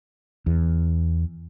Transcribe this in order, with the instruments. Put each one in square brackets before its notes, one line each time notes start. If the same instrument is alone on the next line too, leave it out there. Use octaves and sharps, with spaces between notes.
[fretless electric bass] E2